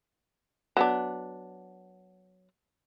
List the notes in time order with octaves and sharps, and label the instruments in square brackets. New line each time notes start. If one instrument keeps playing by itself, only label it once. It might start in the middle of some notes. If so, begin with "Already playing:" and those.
[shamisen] F#3 B3 D4